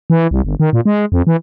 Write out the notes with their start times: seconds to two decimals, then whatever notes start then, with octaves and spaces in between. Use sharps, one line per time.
0.10 E3
0.31 C2
0.45 G1
0.60 D#3
0.73 A#2
0.85 G#3
1.12 F2
1.27 E3